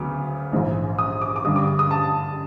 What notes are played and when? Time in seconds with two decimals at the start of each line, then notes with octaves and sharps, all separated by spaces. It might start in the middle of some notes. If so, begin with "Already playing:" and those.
Already playing: D2 C#3 F#3 B3 D6
0.52 A#1 G#2 E3
0.99 D#6
1.22 D6
1.36 D6
1.45 G2 D3 G3 D#6
1.56 D6
1.67 D6
1.79 D#6
1.91 A5